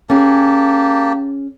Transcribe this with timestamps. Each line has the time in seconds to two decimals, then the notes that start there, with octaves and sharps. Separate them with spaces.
0.10 A#3 C#4 G4 G#4 A5